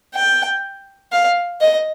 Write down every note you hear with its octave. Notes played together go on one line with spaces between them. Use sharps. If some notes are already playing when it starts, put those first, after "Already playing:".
G5
F5
D#5